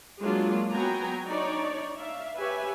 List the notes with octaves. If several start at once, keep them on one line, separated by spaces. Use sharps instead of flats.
F#3 G#3 A#3 D4 F4
F#3 B3 G5 G#5 A#5
D4 D#4 C#5 D5
E5 F5
G4 B4 C#5 E5 G#5